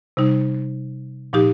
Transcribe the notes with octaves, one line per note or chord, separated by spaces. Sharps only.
C3 G3 D#4
A#2 F3 D#4 G4